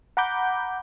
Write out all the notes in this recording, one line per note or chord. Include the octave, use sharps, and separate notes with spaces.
F#5 A#5 B5 D6 G6